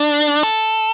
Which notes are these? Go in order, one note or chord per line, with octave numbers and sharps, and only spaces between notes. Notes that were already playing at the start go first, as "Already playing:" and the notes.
Already playing: D4
A4